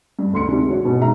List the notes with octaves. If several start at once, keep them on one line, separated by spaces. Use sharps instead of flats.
G2
D2 C6 C#7
C3 D#3 G#3 D4 G4
F#4 C#5
B2 G#3
G#2 E5 A#5